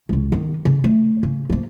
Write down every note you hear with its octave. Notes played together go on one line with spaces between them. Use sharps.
C#2 C#3
D#3 B3
C#3
A3
C#3
F3 A#3